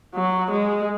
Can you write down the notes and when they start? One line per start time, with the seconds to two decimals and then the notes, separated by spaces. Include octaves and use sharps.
0.15 F#3
0.51 G#3